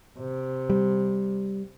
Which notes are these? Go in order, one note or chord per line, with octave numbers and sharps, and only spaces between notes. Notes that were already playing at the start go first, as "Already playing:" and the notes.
C3
G3